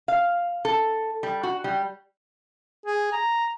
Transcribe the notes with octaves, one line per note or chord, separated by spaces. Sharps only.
F5
A4
G3
F#4
G3
G#4
A#5